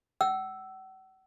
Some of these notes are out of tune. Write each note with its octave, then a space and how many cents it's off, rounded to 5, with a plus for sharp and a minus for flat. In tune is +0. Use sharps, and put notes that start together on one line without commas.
F#5 +40 E6 +0